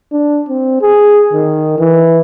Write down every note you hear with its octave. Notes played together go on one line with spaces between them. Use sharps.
D4
C4
G#4
D#3
E3